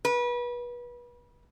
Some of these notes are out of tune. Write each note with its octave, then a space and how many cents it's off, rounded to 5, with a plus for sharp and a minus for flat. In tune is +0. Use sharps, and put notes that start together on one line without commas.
B4 -30